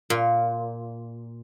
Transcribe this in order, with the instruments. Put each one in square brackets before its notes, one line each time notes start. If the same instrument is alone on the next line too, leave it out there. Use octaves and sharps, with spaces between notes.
[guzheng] A#2